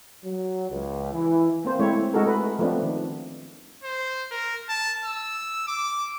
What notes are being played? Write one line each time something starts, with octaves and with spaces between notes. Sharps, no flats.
F#3
C#2
E3
A#3 C4 C5
G#3 A3 C4 E4 C#5
G#3 D#4 F#4 A4 A#4
A3 B4
F3 A3 B3 C4 D4
D#3
C5
A#4
A5
E6
D6